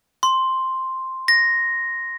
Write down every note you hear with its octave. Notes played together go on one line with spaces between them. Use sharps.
C6
A#6